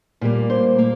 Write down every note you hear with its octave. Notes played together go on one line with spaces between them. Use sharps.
A#2 G3 A#3
C5
A#3